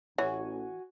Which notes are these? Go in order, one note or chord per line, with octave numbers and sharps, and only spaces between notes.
A1 E3 F#4 C#5 F#5 G#5